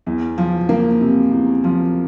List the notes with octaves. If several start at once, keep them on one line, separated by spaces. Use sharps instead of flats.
E2
F3
A#3
C3
E2
F3